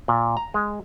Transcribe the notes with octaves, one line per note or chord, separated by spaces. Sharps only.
A#2
A#5
G#3